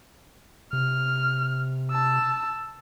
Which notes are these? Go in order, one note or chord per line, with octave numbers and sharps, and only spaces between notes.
C3 F6
A5 E6